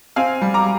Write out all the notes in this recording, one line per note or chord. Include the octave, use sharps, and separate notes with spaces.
C4 F5 G#5
G3
A#5 D6